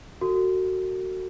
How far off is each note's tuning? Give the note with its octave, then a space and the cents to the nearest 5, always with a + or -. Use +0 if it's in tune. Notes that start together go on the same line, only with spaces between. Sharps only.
F#4 +10 A4 +40